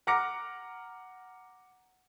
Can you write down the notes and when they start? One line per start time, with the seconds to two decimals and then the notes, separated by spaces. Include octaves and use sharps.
0.07 F#5 A#5 D6 F6 A#6 C#7